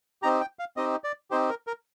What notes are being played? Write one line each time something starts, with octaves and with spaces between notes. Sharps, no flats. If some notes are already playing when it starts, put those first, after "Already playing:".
C4 D#4 G4 A#5
G5
F5
C4 D#4 G4 D#5
D5
C4 D#4 G4 C5
A#4
A#4